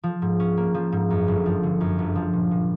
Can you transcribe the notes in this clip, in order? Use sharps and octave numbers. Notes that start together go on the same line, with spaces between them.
F3
G#2
C#4
A#3
F3
G#2
F#2
G1
F3
D3
F#2
G1
F3
A#2
A#2